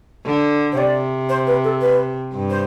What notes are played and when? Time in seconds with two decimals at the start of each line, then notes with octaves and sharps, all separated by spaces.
0.26 D3
0.73 C5
0.78 C3 D5
1.29 C5
1.47 B4
1.64 A4
1.81 B4
2.33 G2
2.50 C5